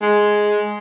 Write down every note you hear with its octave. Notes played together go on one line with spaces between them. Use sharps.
G#3